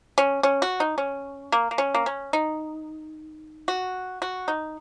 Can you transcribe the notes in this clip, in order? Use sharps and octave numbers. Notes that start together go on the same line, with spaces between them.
C#4
C#4
F#4
D#4
C#4
A#3
A#3
C#4
A#3
C#4
D#4
F#4
F#4
D#4